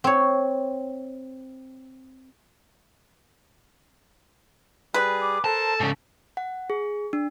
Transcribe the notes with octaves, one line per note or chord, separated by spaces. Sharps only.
C4 C#5
G3 G#4 B4
D6
A4 A#4 C5 A5
G#2 C#3
F#5
G#4
D4